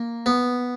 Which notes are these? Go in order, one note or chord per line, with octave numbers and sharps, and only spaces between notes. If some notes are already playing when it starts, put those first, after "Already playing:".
Already playing: A#3
B3